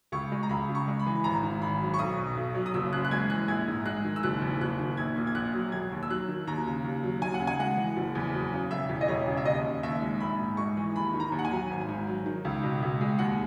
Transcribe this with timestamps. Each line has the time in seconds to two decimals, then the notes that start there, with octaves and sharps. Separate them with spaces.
0.12 C#2 C#6
0.32 G#3
0.43 A#5
0.49 C#2 B5
0.69 C#3
0.75 C#6
0.88 G#3
1.00 B5
1.07 E3
1.15 B5
1.24 G#1 A#5
1.43 G#2
1.62 G#1 B5
1.81 F#3
1.94 C#6
1.99 B1 D#6
2.17 B2
2.37 B1
2.55 F#3
2.66 D#6
2.74 F#1 E6
2.93 F#2 F#6
3.05 F#6
3.11 G#3 G#6
3.30 E3 F#6
3.48 A#1 G#6
3.68 G#2
3.86 G#3 F#6
4.05 D#3
4.16 E6
4.23 F#1 F#6
4.42 E2
4.61 F#1 F#6
4.79 D#3
4.97 A#1 G#6
5.16 A#2
5.27 G#6
5.35 A#1 F#6
5.54 F#3
5.72 E1 G#6
5.92 D#2
6.03 E6
6.09 F#3 F#6
6.28 D#3
6.47 D#2 A#5
6.67 C#3
6.84 D#2
7.03 F#3
7.22 D#2 G#5
7.34 F#5
7.40 C#3
7.47 G#5
7.60 G#3 F#5
7.77 E3
7.96 F#1
8.15 E2
8.33 F#3
8.53 C#3
8.71 E1 E5
8.89 E2
9.01 D#5
9.08 E1 C#5
9.28 C#3
9.37 E5
9.45 D#2 D#5
9.65 C#3
9.83 D#2 E5
10.02 G#3
10.20 A#1 B5
10.39 G#2
10.57 G#3 C#6
10.77 E3
10.96 D#2 B5
11.14 D#3
11.20 A#5
11.32 D#2
11.39 F#5
11.45 G#5
11.51 F#3
11.70 G#1
11.88 G#2
12.07 F#3
12.26 D#3
12.45 C#2
12.63 B2
12.82 C#2
13.01 G#3
13.19 D#2 F#5